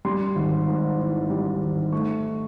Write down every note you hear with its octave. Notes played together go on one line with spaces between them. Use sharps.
G3 C6
G#1
G#2
E3
G3
G#1
A3 C#6